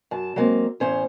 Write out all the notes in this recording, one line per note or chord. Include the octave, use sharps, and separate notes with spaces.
F#2 A5
F#3 G#3 A#3 C4
E2 A2 C#4 C5